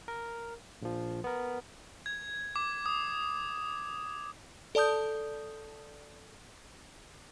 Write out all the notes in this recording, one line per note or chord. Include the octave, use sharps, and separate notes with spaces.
A#4
A#1 F3
B3 A#4
G#6
D6
D#6
A4 D5 A5 D#6 G6